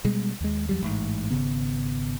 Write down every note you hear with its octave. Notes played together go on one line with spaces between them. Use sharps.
B2 G3 G#3
D#2 G#3
E2 F#3 G3
A1 G#2
G#1 C#3 B3